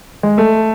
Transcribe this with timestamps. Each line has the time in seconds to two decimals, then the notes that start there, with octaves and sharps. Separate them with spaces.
0.23 G#3
0.38 A3